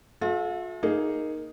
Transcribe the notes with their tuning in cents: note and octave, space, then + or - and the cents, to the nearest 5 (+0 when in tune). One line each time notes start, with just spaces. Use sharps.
F4 +45 A4 -40 E5 +0
A#3 +0 D#4 +0 G#4 +0